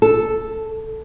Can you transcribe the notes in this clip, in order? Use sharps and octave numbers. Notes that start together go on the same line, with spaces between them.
A4